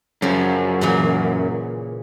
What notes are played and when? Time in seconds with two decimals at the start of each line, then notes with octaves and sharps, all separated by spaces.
0.22 F#2 C#3 F3
0.81 A#2 C#3 E3